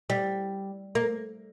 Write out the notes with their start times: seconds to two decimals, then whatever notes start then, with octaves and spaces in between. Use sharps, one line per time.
0.10 G3
0.95 A#3